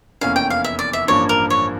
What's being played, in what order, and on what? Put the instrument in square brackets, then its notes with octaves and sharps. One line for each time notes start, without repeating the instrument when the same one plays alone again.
[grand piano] F1 E2 E3 A#3 C#4 [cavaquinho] F5
[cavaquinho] G5
F5
E5
D5
E5
[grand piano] A1 G2 F3 A#3 D4 [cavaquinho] C#5
[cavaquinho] A#4
C#5